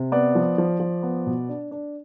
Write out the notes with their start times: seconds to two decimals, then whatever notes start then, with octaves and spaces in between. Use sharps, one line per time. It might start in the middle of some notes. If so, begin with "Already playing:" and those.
Already playing: C3
0.12 B3 D5
0.35 F3
0.58 F3
0.80 F3
1.03 B3
1.26 B2
1.49 D4
1.71 D4